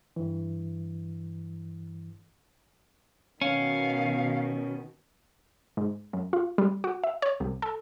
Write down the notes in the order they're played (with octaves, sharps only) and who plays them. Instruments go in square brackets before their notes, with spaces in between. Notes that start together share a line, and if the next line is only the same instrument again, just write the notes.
[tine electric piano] G2 E3
[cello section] B2 D#3 [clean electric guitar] C#4 [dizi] F5
[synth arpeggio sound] G#2
F#2
F4
G3
F#4
E5
C#5
C2
A4